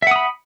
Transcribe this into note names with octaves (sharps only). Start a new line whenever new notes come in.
E5 F#5 B5 D#6